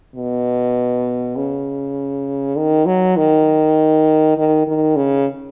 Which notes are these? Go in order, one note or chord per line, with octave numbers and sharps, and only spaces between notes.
B2
C#3
D#3
F#3
D#3
D#3
D#3
C#3